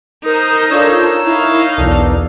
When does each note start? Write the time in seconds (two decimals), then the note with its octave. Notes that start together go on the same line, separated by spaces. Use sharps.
0.24 D#4 A#4 C5 D#6
0.70 D4 F4 A4 A#4 C#5 E6
1.25 D#4 E4 F5
1.77 B1 E2 D4 A4 A#4